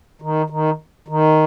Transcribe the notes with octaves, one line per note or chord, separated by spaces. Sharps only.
D#3
D#3
D#3